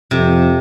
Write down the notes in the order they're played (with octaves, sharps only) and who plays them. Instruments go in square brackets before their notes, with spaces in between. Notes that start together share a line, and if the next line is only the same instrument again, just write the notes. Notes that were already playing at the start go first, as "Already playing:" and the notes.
[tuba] F2 [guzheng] C3